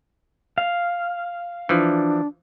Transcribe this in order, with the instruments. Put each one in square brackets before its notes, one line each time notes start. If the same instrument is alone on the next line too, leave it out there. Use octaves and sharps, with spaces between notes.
[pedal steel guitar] F5
[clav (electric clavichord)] E3 F3 [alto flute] D4